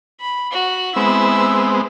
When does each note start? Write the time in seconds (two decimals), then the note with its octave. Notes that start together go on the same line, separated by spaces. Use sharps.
0.21 B5
0.52 F#4 F#6
0.96 G#3 B3 C4 E4 E6